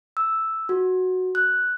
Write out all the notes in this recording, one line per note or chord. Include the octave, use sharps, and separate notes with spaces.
E6
F#4
F#6